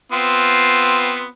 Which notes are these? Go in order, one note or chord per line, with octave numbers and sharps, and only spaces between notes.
B3 C4 F4